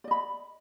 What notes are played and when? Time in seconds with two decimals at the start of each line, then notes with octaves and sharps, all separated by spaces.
0.04 D5
0.08 D#5
0.11 B5